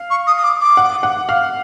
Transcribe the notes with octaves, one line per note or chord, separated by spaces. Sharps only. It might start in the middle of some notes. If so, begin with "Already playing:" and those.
Already playing: F5
C#6
D#6
D#6
D6
D6
F#5
F#5
F5